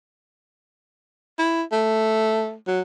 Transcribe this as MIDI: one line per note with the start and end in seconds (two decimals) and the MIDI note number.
1.38 1.62 64
1.72 2.54 57
2.67 2.81 54